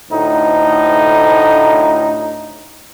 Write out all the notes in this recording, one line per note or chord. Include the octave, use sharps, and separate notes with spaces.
D2 A2 D#4